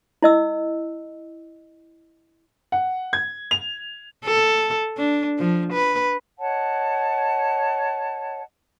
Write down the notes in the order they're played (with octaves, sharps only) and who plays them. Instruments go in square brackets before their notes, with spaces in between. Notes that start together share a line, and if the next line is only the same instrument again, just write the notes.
[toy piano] E4 D#5 E6
[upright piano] F#5
G#6
F7
[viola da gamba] A4
D4
F3
B4
[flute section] C#5 D#5 F#5 A5